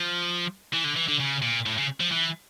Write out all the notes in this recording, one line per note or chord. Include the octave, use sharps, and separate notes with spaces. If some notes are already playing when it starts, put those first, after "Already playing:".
Already playing: F3
E3
D3
E3
D3
C#3
A#2
A2
C#3
F3
E3